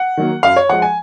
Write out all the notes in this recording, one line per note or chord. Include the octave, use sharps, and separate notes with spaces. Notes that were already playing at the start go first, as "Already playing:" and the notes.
Already playing: F#5
D#3 F#3 A#3
F#2 F5
C#5
F3 G#3 F#5
G#5